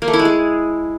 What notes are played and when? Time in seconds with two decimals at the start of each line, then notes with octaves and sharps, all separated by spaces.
0.02 A#3
0.08 A3
0.13 E4
0.19 G#3
0.25 G#4